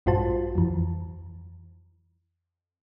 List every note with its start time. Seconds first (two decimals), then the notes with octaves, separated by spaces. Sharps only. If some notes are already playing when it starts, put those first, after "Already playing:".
0.06 A#1 G2 F4 F#4 C5 A5
0.55 F2 E3